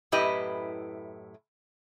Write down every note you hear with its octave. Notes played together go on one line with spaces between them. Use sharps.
F#2 A2 E4 G4 B4 D#5